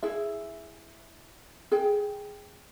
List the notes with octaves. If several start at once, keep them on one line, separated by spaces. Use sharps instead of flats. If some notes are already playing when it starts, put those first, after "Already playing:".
E4 G#4 E5
G#4 G5